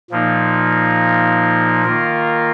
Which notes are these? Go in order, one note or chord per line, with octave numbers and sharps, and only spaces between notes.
A#2 F3 A#3 D#4
D#3 A#3 F4 A#4